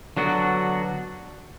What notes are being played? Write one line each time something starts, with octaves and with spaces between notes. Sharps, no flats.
D3 F#3 B3 D4 F#4